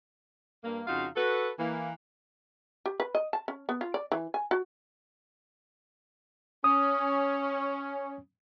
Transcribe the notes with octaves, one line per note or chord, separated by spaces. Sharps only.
G2 A#3
F2 C#3 D#4 F4 F#4 F5
F#4 A4 B4
E3 A#3
G4
B4
D#5
A5
C#4
B3
F4
D5
E3
G#5
F#4
C#4 D#6